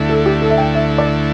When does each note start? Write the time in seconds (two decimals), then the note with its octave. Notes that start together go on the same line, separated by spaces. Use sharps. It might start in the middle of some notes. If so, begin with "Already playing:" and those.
Already playing: D2 D3 A3 E4
0.09 A4
0.26 G4
0.42 A4
0.50 E5
0.58 G5
0.75 E5
0.98 D5